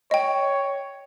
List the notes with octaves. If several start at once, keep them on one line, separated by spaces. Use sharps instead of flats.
C#5 D#5 G5